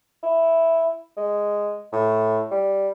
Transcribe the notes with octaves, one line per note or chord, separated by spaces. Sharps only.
E4
G#3
A2
G3